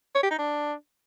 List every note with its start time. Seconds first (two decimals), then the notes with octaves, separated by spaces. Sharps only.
0.15 C#5
0.23 G4
0.31 D#4
0.38 D4